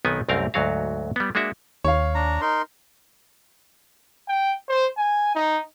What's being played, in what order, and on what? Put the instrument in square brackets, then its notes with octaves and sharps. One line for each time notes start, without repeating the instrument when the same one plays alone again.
[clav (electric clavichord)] B1 D#3 B3 C4 G#5
C2 F#2 A3 C4 A#4 F5
D2 G#2 F#3 F#4 F5
G3 B3
G#3 A#3 D4 F#4 E5
[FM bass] D#2 [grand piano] C#5 F5
[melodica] D4 A#5
D#4 A#4 C6
[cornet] G5
C5
G#5
D#4